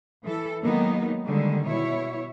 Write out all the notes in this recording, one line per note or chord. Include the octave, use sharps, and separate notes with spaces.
E3 A4
D#3 F#3 G#3 A#3 B3 D#4
D3 D#3 G3 G#3 A#3
B2 E4 C#5